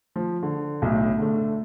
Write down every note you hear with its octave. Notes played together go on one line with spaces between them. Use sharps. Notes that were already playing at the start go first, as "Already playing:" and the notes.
F3
D3
B1 A2
D3 A3